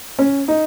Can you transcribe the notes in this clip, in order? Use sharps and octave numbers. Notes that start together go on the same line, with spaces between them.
C#4
D#4